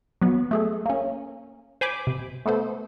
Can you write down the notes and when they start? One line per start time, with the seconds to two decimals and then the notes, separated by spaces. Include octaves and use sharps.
0.22 F#3 B3
0.51 A3 G#4 A4
0.86 A#3 C#4
1.81 C5 G#5 B5 D6
2.07 C3
2.46 A3 B3 A4 C5